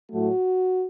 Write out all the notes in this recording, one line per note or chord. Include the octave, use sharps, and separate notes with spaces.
A2 F#3 A3 F#4